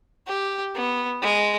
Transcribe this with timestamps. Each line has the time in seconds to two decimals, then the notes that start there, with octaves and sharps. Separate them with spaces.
0.27 G4
0.75 B3
1.22 G#3